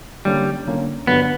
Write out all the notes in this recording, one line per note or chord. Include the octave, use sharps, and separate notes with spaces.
D3 G3 A#3 C#4
D3 A#3 C#4
G2 D3 F#3 B3